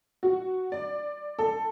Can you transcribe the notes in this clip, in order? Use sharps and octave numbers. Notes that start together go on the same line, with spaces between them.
F#4
D5
A4